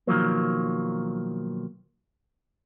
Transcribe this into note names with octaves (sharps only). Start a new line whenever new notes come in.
B1 D#3 F3 F#3 A#3